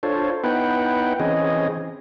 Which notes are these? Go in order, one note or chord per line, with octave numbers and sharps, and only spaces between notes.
D4 F4 A4 C5 C#5
B3 D#4 E4 B4 F#5 G5
E3 C4 C#4 G#4 D#5